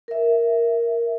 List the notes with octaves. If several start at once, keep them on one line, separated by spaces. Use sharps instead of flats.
A#4 E5